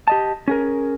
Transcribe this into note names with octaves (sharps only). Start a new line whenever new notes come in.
G4 D#5 A5
C#4 G#4 A#4